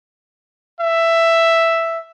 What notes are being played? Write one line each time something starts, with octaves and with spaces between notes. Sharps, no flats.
E5